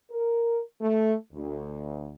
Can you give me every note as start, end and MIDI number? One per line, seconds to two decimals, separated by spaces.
0.11 0.60 70
0.81 1.13 57
1.33 2.14 38